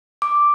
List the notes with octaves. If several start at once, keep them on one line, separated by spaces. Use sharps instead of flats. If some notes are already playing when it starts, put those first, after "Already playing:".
D6